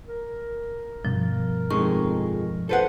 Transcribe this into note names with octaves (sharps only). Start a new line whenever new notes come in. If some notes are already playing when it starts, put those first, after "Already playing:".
A#4
G2 B2 F3
F2 G#3 D#4 C#6
A4 B4 C5 F#5